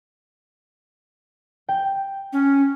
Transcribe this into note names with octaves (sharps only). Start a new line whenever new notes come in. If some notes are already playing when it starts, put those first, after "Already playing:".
G5
C#4